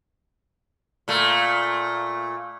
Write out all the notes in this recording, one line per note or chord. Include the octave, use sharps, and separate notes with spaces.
A#2 A3